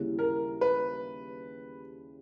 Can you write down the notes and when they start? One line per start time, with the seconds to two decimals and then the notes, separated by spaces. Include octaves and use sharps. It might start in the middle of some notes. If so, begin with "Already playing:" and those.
Already playing: D#2 C#3 G3 C#4 E4
0.19 A#4
0.61 B4